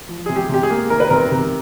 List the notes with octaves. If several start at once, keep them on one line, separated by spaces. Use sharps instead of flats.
F3
C3 G#4
G4
C3 G4
G#4
A#3
D#3 A#4
B4
C3 A#4
C3